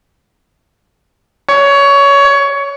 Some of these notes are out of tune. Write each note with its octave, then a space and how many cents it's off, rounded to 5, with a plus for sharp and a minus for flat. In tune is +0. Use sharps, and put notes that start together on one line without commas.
C#5 +20